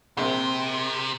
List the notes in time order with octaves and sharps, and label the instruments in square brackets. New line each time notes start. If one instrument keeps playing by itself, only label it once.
[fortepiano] A#1 A#3 [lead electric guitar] C3 [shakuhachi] C4